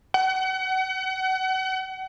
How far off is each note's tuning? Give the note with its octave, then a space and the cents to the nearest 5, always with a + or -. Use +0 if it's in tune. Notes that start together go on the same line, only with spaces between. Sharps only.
F#5 +35